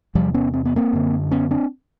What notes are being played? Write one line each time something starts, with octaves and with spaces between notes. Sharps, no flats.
E2 C3 F3 G3
B3 C#4
C4
B3
A#3 C4
F#2 D3
B3 C#4
C4 D4